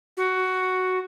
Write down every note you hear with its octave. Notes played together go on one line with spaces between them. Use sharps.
F#4